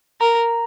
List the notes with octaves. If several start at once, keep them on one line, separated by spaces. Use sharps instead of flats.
A#4 A#5